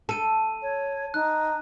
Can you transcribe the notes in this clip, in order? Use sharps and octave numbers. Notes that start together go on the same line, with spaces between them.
A4 A5 D#7
C#5
D#4 F#6